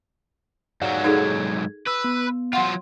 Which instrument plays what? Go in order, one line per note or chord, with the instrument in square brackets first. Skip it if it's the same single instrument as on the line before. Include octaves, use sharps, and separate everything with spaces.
[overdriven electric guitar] G#2 F#3 [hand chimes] D5 F5 F#5
[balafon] D#4 G#4 A4 [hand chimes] G#6
[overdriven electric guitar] B4 [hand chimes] E6
[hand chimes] B3
[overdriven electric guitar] F#3 F4 [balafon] F#5 C6